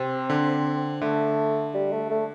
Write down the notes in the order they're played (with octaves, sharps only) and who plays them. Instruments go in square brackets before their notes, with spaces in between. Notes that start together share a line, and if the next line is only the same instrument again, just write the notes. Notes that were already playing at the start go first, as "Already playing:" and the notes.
Already playing: [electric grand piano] C3 [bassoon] C4
[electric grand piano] D3
[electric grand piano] D3 [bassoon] A3
[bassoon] G3
A3
A3